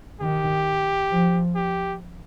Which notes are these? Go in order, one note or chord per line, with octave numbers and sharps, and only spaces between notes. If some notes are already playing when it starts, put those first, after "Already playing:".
D#3 G4
F3
G4